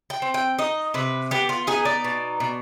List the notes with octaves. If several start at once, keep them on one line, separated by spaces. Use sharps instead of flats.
G5
C4
G5
D#4 D#5
C3 B4
B3 G4
F4
D#4 G#4
D5
B2
B2